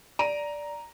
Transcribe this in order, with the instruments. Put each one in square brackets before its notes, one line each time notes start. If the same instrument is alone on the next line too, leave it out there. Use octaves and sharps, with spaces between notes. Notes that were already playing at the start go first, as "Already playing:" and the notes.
[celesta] D5 [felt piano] A#5 D7 D#7